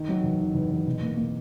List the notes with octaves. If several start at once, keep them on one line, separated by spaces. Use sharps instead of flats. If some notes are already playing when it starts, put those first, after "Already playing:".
Already playing: D#3
F#3
E2
D#3
E2
E2
B2
A#3
A#3